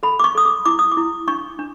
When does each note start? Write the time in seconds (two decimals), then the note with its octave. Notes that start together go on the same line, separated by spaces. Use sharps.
0.03 A4 B5
0.20 D6
0.24 C#6
0.35 A4 D#6
0.45 D6
0.65 E4 D6
0.79 D#6
0.92 D6
0.97 E4
1.28 D4 C#6
1.59 D4